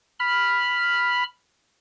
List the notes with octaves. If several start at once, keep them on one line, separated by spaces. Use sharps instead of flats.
B5 F6